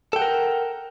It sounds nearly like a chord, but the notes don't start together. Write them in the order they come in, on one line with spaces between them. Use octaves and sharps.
A4 G5 F#5 A#4